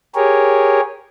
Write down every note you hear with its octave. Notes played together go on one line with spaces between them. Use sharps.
G4 G#4 A#4 C#5